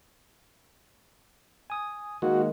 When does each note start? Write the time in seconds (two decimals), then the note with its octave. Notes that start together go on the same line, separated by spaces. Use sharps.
1.70 G#5 D#6
2.22 D#3 G#3 A#3 F#4